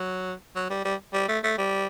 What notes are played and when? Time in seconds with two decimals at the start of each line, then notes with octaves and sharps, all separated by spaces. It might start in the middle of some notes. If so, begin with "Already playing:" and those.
Already playing: F#3
0.56 F#3
0.70 G3
0.85 G3
1.13 G3
1.29 A3
1.44 A3
1.58 G3